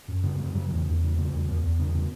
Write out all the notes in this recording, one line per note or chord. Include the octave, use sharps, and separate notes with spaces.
F#2
C#3 B3
F#2 G#3
C#3 F#3
E2 E3
E2
C#3
C#3 A#3
E2
E2 B3
E2
C#3 B3
C#3